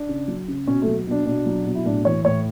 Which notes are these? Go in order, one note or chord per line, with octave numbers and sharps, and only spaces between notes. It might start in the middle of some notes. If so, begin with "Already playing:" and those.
Already playing: D4
C#3
F#3
C#3
B2 C#4
F#3 A3
B2 D4
B2 D4
F#3
B2
E4
A2 D4
E3 C#5
A2 C#5